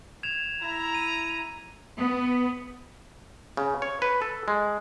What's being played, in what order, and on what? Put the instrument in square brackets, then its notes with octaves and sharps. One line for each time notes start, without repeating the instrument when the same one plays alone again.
[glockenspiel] G#6 E7 F7
[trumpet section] E4 A#5
[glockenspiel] D#7
[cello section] B3
[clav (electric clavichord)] C#3
C#5
B4
A4
G#3